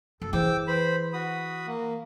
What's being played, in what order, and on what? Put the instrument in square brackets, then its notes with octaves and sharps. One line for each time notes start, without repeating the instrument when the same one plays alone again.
[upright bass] F#2 [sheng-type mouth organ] A4
[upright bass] E3 [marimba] G#4 C5 [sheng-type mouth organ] G5 D6 E6
[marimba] B4 [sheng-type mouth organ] C5 B5
[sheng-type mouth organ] F#4 B5 D#6
A#3